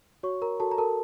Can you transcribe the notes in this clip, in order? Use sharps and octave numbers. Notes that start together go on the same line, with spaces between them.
F#4 C#5 C#6
A#4 A#5
F#4 A4 A5
A#5
A4 A#4 A5